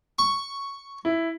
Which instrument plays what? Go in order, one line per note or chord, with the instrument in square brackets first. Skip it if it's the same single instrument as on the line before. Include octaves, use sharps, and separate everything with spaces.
[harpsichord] C#6
[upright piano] E4